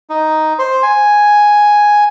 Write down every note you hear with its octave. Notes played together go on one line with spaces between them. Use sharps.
D#4
C5
G#5